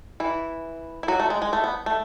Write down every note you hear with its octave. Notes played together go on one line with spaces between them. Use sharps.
E3 E4
E4
F#3 F#4
A3
G#3
G#3
A3
B3
A3